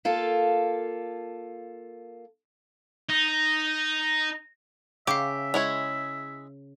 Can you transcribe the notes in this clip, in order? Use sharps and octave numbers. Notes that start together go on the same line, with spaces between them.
A#3 F4 A4
D#4
C#3 G4 E5 F5 D6
G#3 E4 C#5 F7